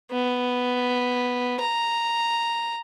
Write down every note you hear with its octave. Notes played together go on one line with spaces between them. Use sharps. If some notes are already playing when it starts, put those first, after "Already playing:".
B3
A#5